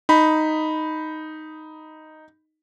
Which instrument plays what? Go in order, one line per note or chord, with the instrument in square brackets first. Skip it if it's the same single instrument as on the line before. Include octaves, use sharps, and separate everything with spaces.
[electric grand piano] D#4 B5